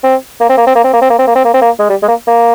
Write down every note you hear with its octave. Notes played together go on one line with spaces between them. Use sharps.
C4
A#3
C4
A#3
C4
A#3
C4
A#3
C4
A#3
C4
A#3
C4
A#3
C4
A#3
G#3
G3
G#3
A#3
A#3